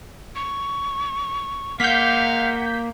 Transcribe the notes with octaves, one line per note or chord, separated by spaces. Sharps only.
C#6
G#3 A#3 F5 F#5 G6 B6